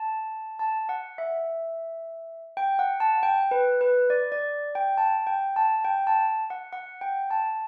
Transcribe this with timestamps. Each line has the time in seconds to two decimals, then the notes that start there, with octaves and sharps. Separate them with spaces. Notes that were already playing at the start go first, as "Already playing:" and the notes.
Already playing: A5
0.59 A5
0.89 F#5
1.18 E5
2.57 G5
2.79 F#5
3.00 A5
3.23 G5
3.51 B4
3.81 B4
4.10 D5
4.32 D5
4.75 G5
4.98 A5
5.27 G5
5.56 A5
5.85 G5
6.07 A5
6.50 F#5
6.73 F#5
7.01 G5
7.31 A5